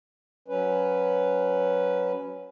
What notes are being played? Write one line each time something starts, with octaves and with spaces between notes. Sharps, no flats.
F#3 C#4 B4